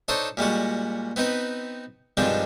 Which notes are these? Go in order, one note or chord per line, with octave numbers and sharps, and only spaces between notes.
D4 D#4 A4 C5 C#5 D#5
A#2 G3 G#3 F#4
B3 C4 D#4 B4
G2 D#3 F3 G#3 C4 D4